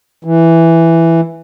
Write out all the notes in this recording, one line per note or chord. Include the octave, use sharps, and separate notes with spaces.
E3